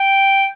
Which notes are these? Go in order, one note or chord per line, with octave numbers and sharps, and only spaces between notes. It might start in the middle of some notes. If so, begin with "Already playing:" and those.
Already playing: G5